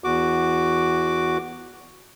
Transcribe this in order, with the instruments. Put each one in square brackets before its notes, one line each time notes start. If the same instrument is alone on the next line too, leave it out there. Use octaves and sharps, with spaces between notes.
[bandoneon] E2 F#4 D6